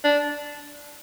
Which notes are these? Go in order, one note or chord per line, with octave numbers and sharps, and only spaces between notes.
D4